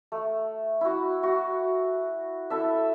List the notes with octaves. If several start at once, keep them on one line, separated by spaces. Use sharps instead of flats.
A3
E4 F#4
F#4
E4 A4 E5